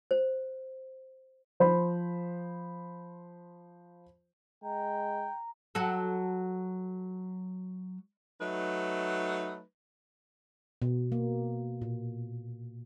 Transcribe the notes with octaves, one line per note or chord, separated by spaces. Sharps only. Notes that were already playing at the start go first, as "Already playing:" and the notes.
C5
F3 C5 B5
G#3 G5 A#5
F#3 F#4 A4
F#3 A3 D#4 B4
B2
A#3
A#2